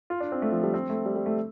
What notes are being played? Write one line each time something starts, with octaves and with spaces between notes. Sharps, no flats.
F4
D4
C4
A3
F3
G3
C4
A3
G3
G3
A3